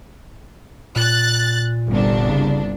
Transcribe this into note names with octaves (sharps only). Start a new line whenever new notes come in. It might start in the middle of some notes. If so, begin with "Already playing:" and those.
A#2 F#6 A6
G1 C2 D4
C#3